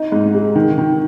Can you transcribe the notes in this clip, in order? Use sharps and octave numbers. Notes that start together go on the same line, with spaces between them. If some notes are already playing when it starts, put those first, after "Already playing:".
Already playing: D#4
G#2
G#3
D#3
D#3